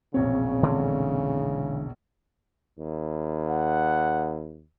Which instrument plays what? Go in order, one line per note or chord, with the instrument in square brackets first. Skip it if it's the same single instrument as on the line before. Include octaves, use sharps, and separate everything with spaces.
[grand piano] E1 A#1 C#5 [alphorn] C#3 [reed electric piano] C4
[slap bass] D3 E3 G#3
[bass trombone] D#2
[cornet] F#5